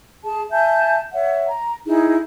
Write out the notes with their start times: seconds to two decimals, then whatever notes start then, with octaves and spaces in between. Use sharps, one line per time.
0.23 G#4 A5
0.51 E5 G#5 A5 G6
1.13 C#5 E5 F#5
1.49 A#5
1.86 D#4 E4 G#4